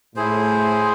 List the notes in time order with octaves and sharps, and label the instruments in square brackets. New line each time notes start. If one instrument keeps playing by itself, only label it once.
[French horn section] A2 [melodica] E4 G#4 C5